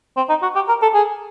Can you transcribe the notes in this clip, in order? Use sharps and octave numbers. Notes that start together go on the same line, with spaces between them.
C4
D#4
F#4
G4
A#4
A4
G#4